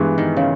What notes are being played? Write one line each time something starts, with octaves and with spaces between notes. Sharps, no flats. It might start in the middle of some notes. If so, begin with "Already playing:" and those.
Already playing: G2 E3 G#3 B3
D#3
C#3